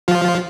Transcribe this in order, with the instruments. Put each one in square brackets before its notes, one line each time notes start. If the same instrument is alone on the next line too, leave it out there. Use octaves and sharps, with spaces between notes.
[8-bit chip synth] F3 F4